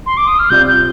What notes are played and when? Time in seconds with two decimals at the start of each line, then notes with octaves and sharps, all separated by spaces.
0.06 C6
0.17 D6
0.27 D#6
0.39 F6
0.50 C3 G3 C4 F4 G6
0.67 G6